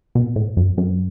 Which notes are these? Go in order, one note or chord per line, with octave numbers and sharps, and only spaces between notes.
B2
A2
F#2
F#2